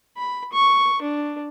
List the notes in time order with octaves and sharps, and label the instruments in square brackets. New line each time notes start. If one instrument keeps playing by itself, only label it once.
[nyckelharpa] B5
C#6
D4